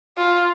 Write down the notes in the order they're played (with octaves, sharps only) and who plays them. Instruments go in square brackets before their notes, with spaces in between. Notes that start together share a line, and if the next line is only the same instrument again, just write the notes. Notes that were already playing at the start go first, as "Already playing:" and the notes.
[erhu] F4